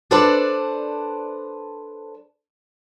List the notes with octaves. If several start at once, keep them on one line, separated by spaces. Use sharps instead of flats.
D4 A4 B4 C5 D5